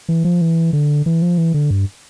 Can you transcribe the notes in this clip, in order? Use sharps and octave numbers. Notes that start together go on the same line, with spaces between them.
E3
F3
E3
D3
E3
F3
E3
D3
G2